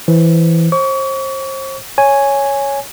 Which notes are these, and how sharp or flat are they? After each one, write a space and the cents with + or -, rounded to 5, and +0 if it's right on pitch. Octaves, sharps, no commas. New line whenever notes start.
E3 +0 C5 +0
C5 +35 C#6 +40
C#5 +0 G#5 +0